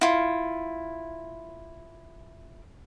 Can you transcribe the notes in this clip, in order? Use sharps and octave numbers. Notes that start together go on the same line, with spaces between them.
E4 F4